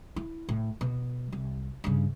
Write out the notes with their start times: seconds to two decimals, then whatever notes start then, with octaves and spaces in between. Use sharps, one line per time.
0.16 E4
0.49 A2
0.81 B2
1.32 C2
1.84 G2 C#3